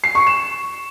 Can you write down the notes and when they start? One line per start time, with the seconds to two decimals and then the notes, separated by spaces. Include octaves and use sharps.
0.04 C7
0.15 C#6
0.27 E7